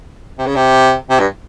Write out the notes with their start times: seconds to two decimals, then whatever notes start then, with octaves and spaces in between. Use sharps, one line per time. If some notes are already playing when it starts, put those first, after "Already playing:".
0.38 C3
0.47 C#3
0.56 C3
1.10 C3
1.19 G2